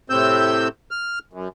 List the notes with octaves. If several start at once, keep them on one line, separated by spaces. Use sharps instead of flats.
A2 C3 C4 E6 G6
F6
F#2